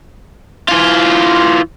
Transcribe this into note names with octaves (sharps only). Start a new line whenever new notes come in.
E3 F4